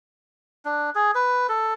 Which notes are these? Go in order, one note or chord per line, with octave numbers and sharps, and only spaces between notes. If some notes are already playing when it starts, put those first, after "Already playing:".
D4
G#4
B4
A4